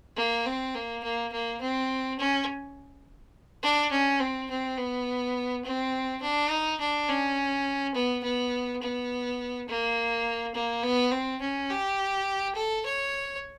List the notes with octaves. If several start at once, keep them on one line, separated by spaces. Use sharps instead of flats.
A#3
C4
A#3
A#3
A#3
C4
C#4
D4
C#4
C4
C4
B3
C4
D4
D#4
D4
C#4
B3
B3
B3
A#3
A#3
B3
C4
C#4
G4
A4
C#5